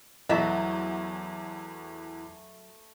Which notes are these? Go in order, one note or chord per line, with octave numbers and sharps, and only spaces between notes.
E2 E3 F#3 A3 D#5 E5 A#5